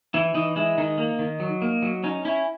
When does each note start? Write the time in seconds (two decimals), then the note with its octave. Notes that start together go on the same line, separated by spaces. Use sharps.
0.14 E3 E4
0.34 E3 D#4
0.56 G#3 E4
0.78 D#3 D#4
0.98 A#3
1.19 D#3
1.40 F#3
1.62 A#3
1.83 F#3
2.04 C#4 D#4
2.25 C#4 E4